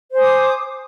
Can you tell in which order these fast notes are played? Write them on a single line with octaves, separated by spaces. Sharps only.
C5 G#5 D#6 D6